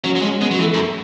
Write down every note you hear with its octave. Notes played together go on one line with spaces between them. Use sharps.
F#3 C#4
F#3
G#3 C#4
G#3 B3
F#3
E3 A3
F#2